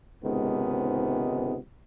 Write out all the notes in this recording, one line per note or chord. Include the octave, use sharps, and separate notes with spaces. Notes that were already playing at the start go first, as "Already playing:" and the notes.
C#2 G#2 C3 D#3 G#3 B3